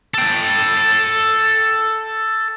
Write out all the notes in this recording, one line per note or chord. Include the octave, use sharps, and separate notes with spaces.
A4 G5